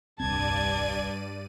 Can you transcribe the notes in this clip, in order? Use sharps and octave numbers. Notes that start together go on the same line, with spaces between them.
D#1 C2 G2 C4 D5 A5 G#6 D#7